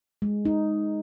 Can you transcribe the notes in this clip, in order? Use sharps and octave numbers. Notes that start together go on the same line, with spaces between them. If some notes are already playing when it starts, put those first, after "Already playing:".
G#3
D#4